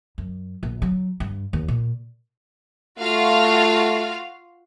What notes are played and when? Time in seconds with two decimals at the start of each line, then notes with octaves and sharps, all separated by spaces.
0.18 F#2
0.63 A#1
0.82 F#3
1.20 G2
1.53 D#2
1.68 A#2
2.99 A3 F4 F#4 F5